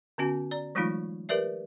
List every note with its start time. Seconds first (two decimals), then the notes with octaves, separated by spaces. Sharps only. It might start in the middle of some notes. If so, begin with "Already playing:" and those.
0.18 D3 B3 C#4 F#4 G#5
0.51 D5 A#5
0.75 E3 F#3 G#3 A3 D#4 F4
1.29 G4 A#4 B4 D5 E5